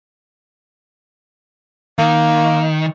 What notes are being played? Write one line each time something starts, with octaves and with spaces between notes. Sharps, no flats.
D#3 A#3